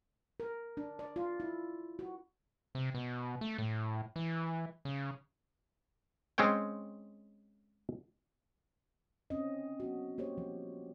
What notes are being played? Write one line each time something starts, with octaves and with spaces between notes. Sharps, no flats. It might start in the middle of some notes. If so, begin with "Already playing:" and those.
A#4
D4
D5
F4
E4
F#4
C3
B2
A3
A2
E3
C#3
G#3 C4 C#4 C#5 G5
C4 C#4 D#5
B3 F#4
A#3 G4 C5 C#5
F3